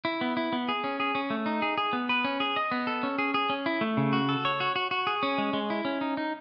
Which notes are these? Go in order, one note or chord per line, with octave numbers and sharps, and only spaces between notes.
E4
B3
E4
B3
G#4
C#4
G#4
C#4
A3
D#4
G#4
G#4
B3
B4
C#4
G#4
D#5
B3
A4
C#4
G#4
G#4
C#4
E4
A3
C#3
F#4
A4
C#5
F#4
F#4
F#4
G#4
C#4
G#3
G#3
E4
C#4
D#4
D#4